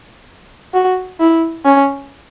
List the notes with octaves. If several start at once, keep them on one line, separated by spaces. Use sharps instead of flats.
F#4
E4
C#4